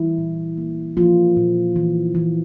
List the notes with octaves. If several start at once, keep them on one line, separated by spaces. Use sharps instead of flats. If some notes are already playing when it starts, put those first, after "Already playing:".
Already playing: E3 G3 E4
A#2
A#3
F3 A#3 F4
A#2
E3
E3